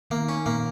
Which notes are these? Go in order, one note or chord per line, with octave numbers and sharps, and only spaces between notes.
D#3 A#3
C#4
A#2 A#3